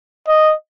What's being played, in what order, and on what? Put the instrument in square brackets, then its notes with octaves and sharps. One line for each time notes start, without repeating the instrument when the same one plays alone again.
[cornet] D#5